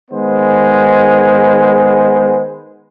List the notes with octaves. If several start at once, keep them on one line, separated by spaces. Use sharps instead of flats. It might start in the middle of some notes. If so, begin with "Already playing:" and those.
D#3 G#3 B3 C5